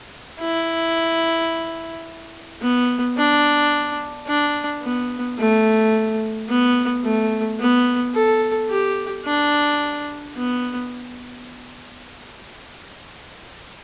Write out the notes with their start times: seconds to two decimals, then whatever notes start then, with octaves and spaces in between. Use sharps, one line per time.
0.40 E4
2.62 B3
3.17 D4
4.27 D4
4.83 B3
5.38 A3
6.48 B3
7.03 A3
7.59 B3
8.15 A4
8.70 G4
9.25 D4
10.36 B3